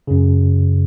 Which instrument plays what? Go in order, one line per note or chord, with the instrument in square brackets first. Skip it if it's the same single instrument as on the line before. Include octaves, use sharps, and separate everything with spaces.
[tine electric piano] F#2 C#3